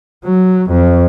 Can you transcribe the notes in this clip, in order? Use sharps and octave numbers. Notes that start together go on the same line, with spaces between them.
F#3
F2